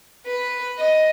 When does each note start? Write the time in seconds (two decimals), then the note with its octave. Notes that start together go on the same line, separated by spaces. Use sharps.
0.27 B4
0.79 D#5